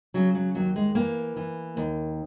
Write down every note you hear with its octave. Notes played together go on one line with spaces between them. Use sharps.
C#3 F#3
F#3
D#2 F#3
G#3
E3 A#3
E3
D#2